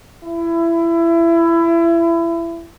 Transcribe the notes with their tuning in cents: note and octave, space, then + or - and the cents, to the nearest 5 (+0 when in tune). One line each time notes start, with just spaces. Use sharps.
E4 +25